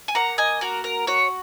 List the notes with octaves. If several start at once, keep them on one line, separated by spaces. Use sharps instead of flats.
G#5
A#3 F#5 A#5
D#5 G#5
F#4 A#4
A#4
F#4 C#5